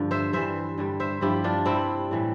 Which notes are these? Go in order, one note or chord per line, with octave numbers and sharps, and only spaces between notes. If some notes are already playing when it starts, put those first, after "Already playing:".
Already playing: G2 D3 F3
C5 E5
G2 E3 G3 C5 E5
G2 D3 G3
C5 E5
G2 F3 E4 G4
D4 F4
C3 G3 C4 E4
A2 E3 G3